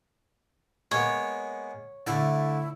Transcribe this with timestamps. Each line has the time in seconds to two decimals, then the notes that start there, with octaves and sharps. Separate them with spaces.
0.91 G#3 A#3 B3 C#5
2.07 D3 A3 E4